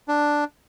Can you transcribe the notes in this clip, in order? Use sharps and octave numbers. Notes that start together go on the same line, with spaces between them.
D4